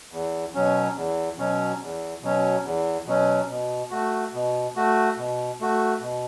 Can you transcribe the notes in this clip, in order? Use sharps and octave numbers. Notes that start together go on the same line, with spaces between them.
E2
B2 F#3 C#4
E2
B2 F#3 C#4
E2
B2 F#3 C#4
E2
B2 F#3 C#4
B2
A3 F#4
B2
A3 F#4
B2
A3 F#4
B2